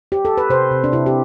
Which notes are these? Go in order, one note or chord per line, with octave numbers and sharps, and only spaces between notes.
G4
A4
B4
C3 C5
C3
D4
C3 E4
G4